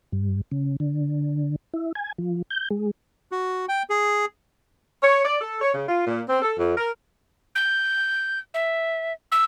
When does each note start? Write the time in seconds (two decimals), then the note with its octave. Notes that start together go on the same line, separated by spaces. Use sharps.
0.12 G2
0.52 C#3
0.80 D3
1.74 E4
1.95 G#5
2.18 F3
2.50 G6
2.71 G#3
3.32 F#4
3.68 G5
3.90 G#4
5.03 C#5
5.25 D5
5.41 A4
5.62 C#5
5.75 C#3
5.89 F4
6.07 A#2
6.29 C4
6.41 A4
6.58 F2
6.77 A#4
7.55 G6
8.54 E5
9.32 E6